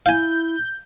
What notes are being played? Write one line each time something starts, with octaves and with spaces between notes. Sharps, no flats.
E4 F5 G#5 G6